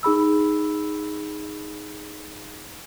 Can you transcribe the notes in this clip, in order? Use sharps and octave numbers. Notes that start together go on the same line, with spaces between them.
D#4 G#4 B5 E6